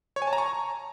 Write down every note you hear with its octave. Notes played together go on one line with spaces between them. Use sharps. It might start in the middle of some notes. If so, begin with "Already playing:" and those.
C#5
G#5
A5
A#5
C#6